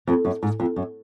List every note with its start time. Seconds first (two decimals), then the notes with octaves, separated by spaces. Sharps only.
0.07 F2
0.25 F#2
0.43 G#2
0.60 F2
0.76 F#2